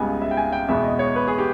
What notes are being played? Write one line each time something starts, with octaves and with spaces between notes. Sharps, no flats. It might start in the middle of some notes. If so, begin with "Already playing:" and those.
Already playing: C#2 C#3 G3 B3 G#5
E5
G5
G#5
G5
E2 B2 G#3 B3 E5
D#5
C#5
B4
G#4
G4